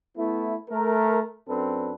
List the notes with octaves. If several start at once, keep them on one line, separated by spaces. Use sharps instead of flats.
A3 B3 E4
A3 A#4
F#2 C4 D4 A4 B4